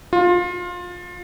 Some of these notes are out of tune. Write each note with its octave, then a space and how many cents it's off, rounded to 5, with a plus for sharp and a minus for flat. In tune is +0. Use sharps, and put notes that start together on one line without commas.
F4 +20